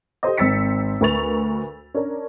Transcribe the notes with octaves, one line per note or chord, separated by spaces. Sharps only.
G4 A4 C5 D#5
G#1 C4 E6 A6 B6 C#7
D2 A#4 B4 C#6 A6 F7
C#4 D4 A#4